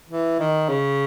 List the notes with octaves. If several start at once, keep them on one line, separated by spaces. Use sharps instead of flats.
E3
D#3
C#3